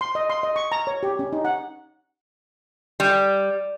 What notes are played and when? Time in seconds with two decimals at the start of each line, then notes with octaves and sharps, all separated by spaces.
0.01 C6
0.15 D#5
0.30 C6
0.43 D#5
0.56 C#6
0.72 A#5
0.87 C#5
1.03 G4
1.19 C#4
1.33 D#4
1.45 F#5
3.00 G3